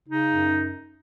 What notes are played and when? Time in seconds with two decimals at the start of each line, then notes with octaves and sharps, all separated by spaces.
0.08 C#3 D#4
0.30 F#2